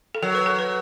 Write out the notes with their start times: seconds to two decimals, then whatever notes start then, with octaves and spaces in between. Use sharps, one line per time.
0.15 A4
0.22 F#3 A#4
0.35 B4
0.46 A4
0.59 B4